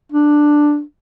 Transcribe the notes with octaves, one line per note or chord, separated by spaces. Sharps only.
D4